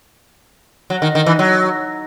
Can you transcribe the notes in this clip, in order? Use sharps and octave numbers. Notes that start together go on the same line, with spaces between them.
F#3
D#3
D#3
E3
F#3